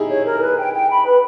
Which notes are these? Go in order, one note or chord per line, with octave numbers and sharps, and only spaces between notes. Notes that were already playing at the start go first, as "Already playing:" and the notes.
Already playing: D#4 E4 G4 G#4
C#5
A#4
B4
G5
G5
B5
B4